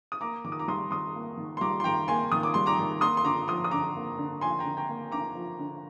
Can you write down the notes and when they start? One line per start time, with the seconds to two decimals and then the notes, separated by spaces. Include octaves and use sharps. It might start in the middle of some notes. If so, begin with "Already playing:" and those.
0.12 D#6
0.21 A#3 A#5 D6
0.44 D#3 D6
0.52 D#6
0.59 A#5 D6
0.68 G3 C6 D#6
0.91 D#3 C6 D#6
1.15 A#3
1.37 D#3
1.57 C6
1.61 G3 A#5 D6
1.80 C6
1.84 D#3 G5 A#5
2.08 A#3 G#5 C6
2.32 D#3 D#6
2.43 D6
2.54 G3 C6
2.66 A#5 D6
2.79 D#3
3.01 A#3 C6 D#6
3.17 C6
3.24 D3 A#5 D6
3.48 F3 C6 D#6
3.64 D#6
3.71 D3 A#5 D6
3.95 A#3
4.18 D3
4.41 F3 G#5 C6
4.59 G5 A#5
4.65 D3
4.77 G5 A#5
4.89 A#3
5.12 D3 A#5 D6
5.35 F3
5.59 D3